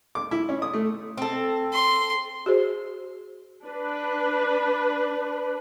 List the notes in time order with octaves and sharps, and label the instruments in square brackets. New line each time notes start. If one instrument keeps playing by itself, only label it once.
[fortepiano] D6
E4
C#4
D#6
A3
[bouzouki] C4 A4
[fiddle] C6
[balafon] F#4 G#4 C5
[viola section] D4 B4